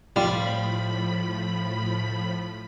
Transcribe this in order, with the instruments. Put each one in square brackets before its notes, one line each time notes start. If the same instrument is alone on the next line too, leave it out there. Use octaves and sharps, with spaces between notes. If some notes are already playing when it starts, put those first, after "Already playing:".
[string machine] A2 F3 B5 [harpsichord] G3 [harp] F4